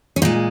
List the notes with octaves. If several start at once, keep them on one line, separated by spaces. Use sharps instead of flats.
C#4
A#2 G#3 D#4